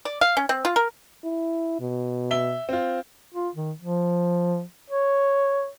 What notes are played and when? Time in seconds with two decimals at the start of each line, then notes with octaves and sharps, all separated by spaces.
0.05 D5
0.21 F5
0.37 C#4
0.49 C4
0.65 F4
0.76 A#4
1.24 E4
1.80 B2
2.31 E5 G7
2.69 C4 F4
3.34 F4
3.55 D#3
3.81 F3
4.90 C#5